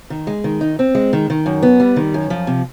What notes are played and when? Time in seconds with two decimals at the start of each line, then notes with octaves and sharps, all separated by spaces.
0.10 D#3
0.27 G#3
0.44 D#3
0.61 D#4
0.79 C4
0.95 G#3
1.13 D#3
1.30 D#3
1.46 F#2
1.63 B3
1.80 G3
1.96 D#3
2.14 F#2
2.30 F3
2.47 C3